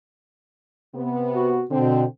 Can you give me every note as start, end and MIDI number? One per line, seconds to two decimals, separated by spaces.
0.94 1.62 48
0.94 1.62 59
1.34 1.64 66
1.71 2.05 47
1.71 2.05 50
1.71 2.05 60